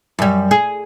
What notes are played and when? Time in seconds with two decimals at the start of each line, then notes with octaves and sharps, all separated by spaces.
0.19 F#2 G3
0.51 G#4